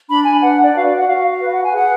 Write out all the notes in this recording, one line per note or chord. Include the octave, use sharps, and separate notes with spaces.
D4 B5
G#5
B4 F#5
D5
F#4 F5
D5
F#5
F#4 F5
F5
B4
F#5
G#5
G#4 F#5